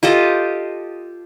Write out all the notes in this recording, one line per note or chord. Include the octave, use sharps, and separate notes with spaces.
F4 G4 A4 D#5